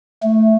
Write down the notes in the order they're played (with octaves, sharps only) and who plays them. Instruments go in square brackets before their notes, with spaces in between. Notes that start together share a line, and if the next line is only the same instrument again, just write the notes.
[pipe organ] A3